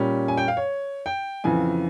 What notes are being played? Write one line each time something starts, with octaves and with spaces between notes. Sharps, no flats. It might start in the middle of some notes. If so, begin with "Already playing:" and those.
Already playing: A#2 G3 C#4
G#5
G5
F5
C#5
G5
F2 C#3 E3 G#5